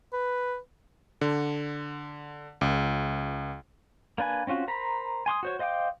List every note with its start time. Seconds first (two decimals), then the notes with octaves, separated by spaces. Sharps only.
0.13 B4
1.21 D3
2.61 C#2
4.18 A#3 D4 B4 G#5
4.47 C4 C#4 F4 F#4
4.68 A#4 C5 A#5 B5
5.26 G#5 C6 D6 D#6
5.43 F#4 C5 C#5
5.59 C5 D#5 F5 G5 D6